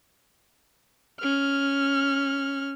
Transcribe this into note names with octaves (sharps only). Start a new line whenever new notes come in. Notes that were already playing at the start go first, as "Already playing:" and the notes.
C#4 F6